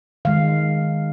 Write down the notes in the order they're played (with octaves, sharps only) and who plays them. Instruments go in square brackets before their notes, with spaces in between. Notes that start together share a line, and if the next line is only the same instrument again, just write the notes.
[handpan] D#3 G#3 F5